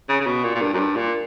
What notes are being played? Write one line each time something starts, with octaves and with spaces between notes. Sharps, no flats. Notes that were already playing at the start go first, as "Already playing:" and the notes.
C#3
C#3
B2
A#2
A#2
G2
F#2
G2
A#2